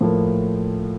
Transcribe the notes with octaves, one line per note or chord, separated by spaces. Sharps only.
A2 F3 A#3